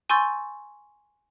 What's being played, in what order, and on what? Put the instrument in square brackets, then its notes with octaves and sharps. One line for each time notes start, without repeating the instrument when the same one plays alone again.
[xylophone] G#5 C6 C#6 E6 G6 A6